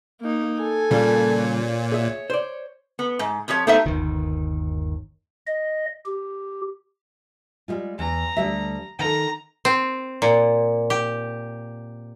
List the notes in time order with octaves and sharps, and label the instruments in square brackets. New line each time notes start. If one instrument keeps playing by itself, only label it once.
[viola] A#3 D#4
A4 G#5
[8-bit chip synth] A#2 [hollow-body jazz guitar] C#3 G3 A#3
[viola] C#5
[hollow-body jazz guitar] G#4 E5
C5 D5
[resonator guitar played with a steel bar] B3
G#2
F2 F3 G4 C#5
A3 B3 D#4 G4 C5 E5
[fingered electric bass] G1 D#2 D#3
[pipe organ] D#5
G4
[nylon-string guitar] G3 G#3 F4
[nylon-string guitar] E2 [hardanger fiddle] A#5
[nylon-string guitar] D2 G3 E5
[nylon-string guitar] D#3 A4 [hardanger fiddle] A#5
[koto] C4
A#2
G4